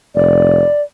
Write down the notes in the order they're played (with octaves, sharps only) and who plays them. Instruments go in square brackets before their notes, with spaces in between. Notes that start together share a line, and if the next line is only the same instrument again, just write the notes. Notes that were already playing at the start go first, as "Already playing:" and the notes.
[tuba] F1 [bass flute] D5